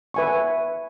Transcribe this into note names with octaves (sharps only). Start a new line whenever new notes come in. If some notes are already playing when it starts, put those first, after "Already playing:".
B4 E5 G#5 C#6